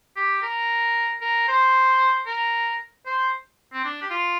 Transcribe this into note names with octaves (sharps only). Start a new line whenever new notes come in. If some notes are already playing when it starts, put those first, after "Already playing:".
G4
A#4
A#4
C5
A#4
C5
C4
D4
G4
F4